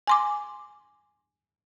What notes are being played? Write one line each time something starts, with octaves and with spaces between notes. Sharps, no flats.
G#5 C6 D6